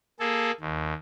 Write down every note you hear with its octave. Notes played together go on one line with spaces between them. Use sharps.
A#3 G#4 A4
D#2